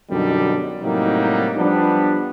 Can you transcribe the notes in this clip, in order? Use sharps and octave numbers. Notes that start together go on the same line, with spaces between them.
F#2 B2 D3 G3 D4 D#4
A2 C3 F#3 G3 A#3 D#4
F3 G3 B3 D4